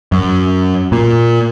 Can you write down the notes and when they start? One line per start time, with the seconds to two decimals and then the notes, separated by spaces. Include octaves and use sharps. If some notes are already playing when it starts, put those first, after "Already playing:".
0.12 F#2
0.92 A#2